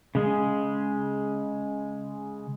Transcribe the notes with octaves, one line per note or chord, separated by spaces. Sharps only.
C#3 G#3 G#4